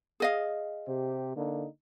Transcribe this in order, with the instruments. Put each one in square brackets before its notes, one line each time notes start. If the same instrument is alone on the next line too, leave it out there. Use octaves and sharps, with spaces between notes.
[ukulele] G#4 D#5 F5
[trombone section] C3 G4 C5
D3 A#3 D#4